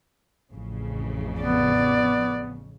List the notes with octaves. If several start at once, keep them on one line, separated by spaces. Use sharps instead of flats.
A1 F2 C#3
B3 D5